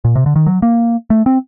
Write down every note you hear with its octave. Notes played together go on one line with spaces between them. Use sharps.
A#2
C3
D3
D#3
F#3
A#3
A3
C4